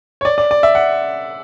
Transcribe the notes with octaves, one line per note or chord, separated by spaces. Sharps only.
C#5
D5
D5
D5
E5
F#5